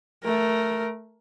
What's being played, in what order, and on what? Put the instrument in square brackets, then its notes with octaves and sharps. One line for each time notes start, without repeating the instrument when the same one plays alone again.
[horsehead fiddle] A3 A#4